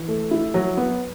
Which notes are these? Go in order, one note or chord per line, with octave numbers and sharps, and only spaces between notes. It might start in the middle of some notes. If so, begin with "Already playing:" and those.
Already playing: E3
A3
E4
F#3
B3